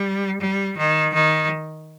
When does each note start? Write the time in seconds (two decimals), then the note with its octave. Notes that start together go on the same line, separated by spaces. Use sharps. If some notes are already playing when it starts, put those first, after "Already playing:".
Already playing: G3
0.40 G3
0.77 D#3
1.14 D#3